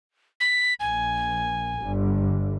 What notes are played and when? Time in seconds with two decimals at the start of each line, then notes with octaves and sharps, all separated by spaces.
0.40 B6
0.80 A#1 G#5
1.79 G1 D3 G3